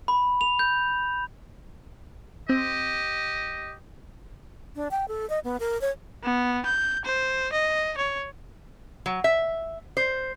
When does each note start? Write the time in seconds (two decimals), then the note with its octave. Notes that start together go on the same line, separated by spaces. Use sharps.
0.08 B5
0.41 F7
0.59 G6
2.49 C4 G4 D#5
4.75 D4
4.91 G5
5.08 A4
5.30 D#5
5.44 B3
5.60 A#4
5.81 C#5
6.23 B3
6.65 G6
7.05 C5
7.53 D#5
7.98 C#5
9.06 F#3
9.24 E5
9.97 C5